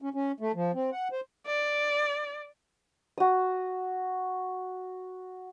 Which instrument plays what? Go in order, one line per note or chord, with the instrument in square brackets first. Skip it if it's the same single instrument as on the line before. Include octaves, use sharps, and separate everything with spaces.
[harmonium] C#4
C#4
A3
F3
C4
F#5
C5
[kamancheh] D5
[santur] F#4 D#6